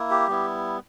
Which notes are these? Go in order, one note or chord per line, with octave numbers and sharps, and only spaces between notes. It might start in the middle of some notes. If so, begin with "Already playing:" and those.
Already playing: A#3 E4
G4
G3 B3 E4